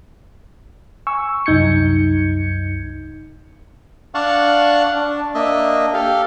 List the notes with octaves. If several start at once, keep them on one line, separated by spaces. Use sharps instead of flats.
G#5 C#6 E6
C2 F#2 D#4 G6 G#6 C#7
D4 D5 F5 F#5 A5 C#6
D4
A#3 D4 D#5 E5
G4 A4 F5